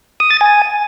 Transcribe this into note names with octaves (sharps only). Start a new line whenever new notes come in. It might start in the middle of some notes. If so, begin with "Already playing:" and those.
D#6
A6
G#5